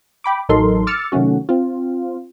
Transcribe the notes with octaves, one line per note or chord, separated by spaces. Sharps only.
G5 B5 D6
A1 F#3 D#4 A4 A#4 C6
D6 E6 F6 A6 C#7
C3 D#3 F#3 A3 C#4 F#4
C4 F4